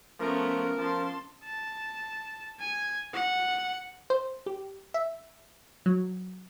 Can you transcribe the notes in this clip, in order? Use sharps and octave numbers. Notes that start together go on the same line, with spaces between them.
F3 A3 B3 C#4 A#4
F3 A5 C6
A5
G#5
F#5
C5
G4
E5
F#3